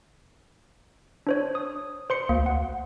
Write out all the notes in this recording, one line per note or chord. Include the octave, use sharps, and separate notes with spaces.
D4 C5 C#5
D#6
C5 C6 C#7
D2 A#3
F#5